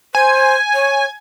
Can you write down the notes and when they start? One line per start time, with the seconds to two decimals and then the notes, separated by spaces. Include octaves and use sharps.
0.15 C5 G#5
0.74 C#5